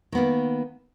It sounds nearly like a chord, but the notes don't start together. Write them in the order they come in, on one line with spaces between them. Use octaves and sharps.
D#3 B3 A#3